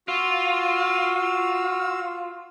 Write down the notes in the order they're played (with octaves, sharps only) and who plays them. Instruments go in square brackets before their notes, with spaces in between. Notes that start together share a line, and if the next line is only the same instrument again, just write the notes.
[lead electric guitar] F4 [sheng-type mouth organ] F#4 E6